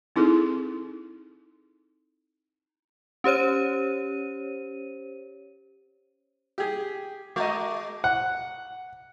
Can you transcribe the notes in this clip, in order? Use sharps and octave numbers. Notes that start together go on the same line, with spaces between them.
C4 D#4 E4 G#4 A4
C#4 G4 C5 C#5 D#7
G4 G#4
G#3 F#4 D#5 A#5 C#6 D6
F#5